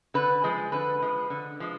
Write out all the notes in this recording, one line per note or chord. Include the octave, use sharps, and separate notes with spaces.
D3 B4
F3 G#3
D3 B4
F3 G#3
D3
F3 G#3